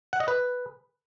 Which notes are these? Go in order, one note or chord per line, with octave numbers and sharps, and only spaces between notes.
F#5
D#5
B4